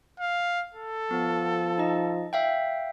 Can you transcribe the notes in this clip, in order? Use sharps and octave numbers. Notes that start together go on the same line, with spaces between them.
F5
A4
F3 B3
D#4 D#5
E5 F5 G5